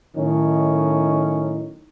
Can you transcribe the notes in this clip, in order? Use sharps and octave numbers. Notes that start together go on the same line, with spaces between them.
A2 D#3 F#3 C#4 D#4